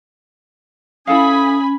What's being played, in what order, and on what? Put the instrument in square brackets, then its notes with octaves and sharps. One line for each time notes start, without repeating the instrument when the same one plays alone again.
[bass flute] C#4 [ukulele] E4 A4 F5 [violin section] G#5 B5 [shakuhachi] D#6